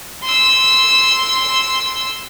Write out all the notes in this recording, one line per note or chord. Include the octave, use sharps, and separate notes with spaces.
C6 E6